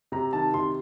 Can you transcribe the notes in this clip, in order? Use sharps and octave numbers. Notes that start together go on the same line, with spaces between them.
C3 A#5
D#3 A5
C3 C6